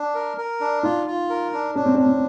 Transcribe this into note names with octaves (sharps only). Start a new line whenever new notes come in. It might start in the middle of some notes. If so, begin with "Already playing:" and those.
Already playing: D4
A#4
A#4
D4
D#4 F4
F4
A#4
D4
C#4 D4
C4
C#4 D4
C4